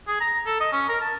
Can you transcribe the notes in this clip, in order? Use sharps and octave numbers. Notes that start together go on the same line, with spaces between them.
G#4
A#5
A4
D#5
C#4
A#4
A5